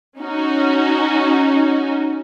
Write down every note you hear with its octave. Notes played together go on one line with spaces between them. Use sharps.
C#4 D#4 F#4